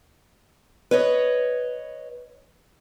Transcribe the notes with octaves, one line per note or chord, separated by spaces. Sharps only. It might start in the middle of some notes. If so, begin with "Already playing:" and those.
B4 C#5 D#5